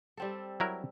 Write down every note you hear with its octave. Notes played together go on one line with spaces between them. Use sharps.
G3 C4 A4
F#3 E4 A#4